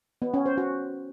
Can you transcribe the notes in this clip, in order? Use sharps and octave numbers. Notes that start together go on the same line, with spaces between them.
B3
C#4
C5
F#4